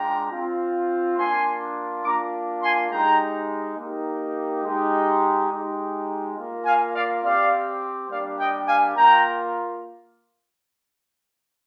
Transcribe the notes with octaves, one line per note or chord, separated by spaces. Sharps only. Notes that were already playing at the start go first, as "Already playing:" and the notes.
Already playing: G#3 D4 F4 G5 A#5
C4 F4
A#3 D4 F4 G#5 C6
A#3 D4 F4 A#5 D6
G#5 C6
G#3 D#4 G4 G5 A#5
A#3 D#4 G4
G#3 D#4 G4
G#3 D#4 G4
A#3 F4
F5 G#5
D5 F5
C4 G4 D5 F5
G3 A#3 D4 G4 D5 F5
D#5 G5
F5 G#5
A#3 F4 G5 A#5